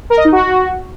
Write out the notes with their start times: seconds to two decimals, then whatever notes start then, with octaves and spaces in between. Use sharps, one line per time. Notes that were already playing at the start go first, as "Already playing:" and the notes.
0.10 A#4
0.17 D#5
0.25 D#4
0.32 F#4